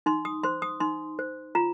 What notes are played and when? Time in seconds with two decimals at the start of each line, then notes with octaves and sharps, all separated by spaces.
0.06 D#4 C6
0.25 D#6
0.43 C5 C6
0.62 D#6
0.80 D#4 C6
1.19 C5
1.55 F4 A#5